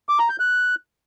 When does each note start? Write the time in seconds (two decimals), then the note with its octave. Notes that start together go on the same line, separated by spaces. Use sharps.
0.09 D6
0.19 A#5
0.29 G6
0.40 F#6